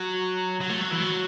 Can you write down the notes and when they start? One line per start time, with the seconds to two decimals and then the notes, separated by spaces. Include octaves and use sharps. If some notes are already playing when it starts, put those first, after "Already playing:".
Already playing: F#3
0.61 F#3
0.69 A3
0.81 F#3
0.91 E3
1.02 F#3